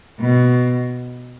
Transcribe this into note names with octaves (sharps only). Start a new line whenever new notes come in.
B2